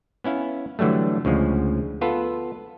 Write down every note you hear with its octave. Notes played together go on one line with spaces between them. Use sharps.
B3 C#4 E4 F5
D3 E3 F#3 G3 A3
D2 C#3 F3 G#3
B3 F4 A4 B4